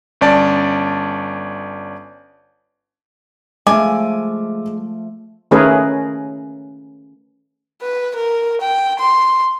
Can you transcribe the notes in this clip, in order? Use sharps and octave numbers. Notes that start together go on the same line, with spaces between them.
G1 C#4 D5 A5
F3 G#3 A3 E5 G#5 D6
D#3 A3 C#4 G#4 A#4 B4
B4
A#4
G5
C6